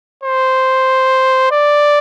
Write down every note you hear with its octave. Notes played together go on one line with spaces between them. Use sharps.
C5
D5